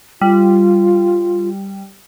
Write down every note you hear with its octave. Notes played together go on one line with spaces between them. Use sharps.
G3 F4